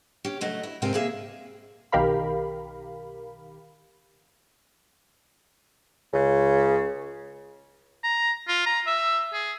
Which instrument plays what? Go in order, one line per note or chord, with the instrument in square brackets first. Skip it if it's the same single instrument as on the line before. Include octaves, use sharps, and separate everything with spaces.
[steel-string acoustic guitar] C#4 G4
C#3 F#3 A3 D#5
E4
G#2 C3 A#4 G5 G#5
A#3 G#4 E5
[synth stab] B1 D#3 G4 A#4 F5 B5
[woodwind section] C#2 C#3
[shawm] A#5
F4
A#5
E5
G#4